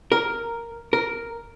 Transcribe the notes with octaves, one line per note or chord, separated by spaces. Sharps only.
A#4
A#4